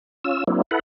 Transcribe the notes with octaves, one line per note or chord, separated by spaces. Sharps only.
C#4 F4 E6
F#3 A#3 C4 D4 E4
E4 A4 B4 F#5